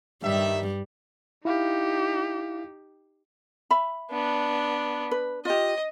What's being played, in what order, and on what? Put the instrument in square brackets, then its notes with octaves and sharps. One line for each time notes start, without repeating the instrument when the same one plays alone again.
[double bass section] G2 [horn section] D#3 E5 [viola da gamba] G3
[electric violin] D#4 G4 [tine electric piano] E4 F5
[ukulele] E5 B5
[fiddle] B3 D4
[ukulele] B4
[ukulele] F4 G4 [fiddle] D#5